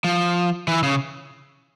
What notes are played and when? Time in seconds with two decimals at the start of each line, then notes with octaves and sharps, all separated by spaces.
0.04 F3
0.68 E3
0.83 C#3